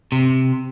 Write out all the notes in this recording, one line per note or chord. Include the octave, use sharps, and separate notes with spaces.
C3